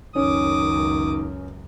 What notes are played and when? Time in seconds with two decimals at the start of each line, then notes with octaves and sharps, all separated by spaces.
0.16 C#2 F#2 D#3 C#4 D6 D#6